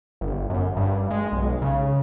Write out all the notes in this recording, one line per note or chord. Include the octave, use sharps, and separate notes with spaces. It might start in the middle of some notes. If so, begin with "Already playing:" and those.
G1
F#2
G2
G#3
B1
C#3